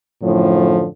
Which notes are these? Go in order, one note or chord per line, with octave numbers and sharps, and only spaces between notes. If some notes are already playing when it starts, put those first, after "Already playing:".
F#2 A2 D3 F3